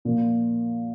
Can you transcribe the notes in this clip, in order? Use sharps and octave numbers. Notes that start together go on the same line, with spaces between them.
A#2 F3 A#3